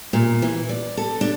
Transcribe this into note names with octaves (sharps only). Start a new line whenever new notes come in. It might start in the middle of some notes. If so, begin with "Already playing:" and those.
A#2
E3
D5
A4
D4